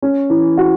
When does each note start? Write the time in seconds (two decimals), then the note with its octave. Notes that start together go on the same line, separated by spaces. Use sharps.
0.02 C#4
0.30 E3
0.57 F#4